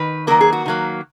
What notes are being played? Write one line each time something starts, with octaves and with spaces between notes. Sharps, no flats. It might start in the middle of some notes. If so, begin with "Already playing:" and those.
Already playing: D#3 B4
D#3 F#3 A#3 A#4
G#4
F#4
D#3 F#3 A#3